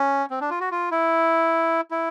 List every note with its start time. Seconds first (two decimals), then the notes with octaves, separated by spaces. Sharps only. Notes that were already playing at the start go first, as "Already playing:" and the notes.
Already playing: C#4
0.30 C4
0.41 D4
0.50 F4
0.60 F#4
0.71 F4
0.91 E4
1.91 E4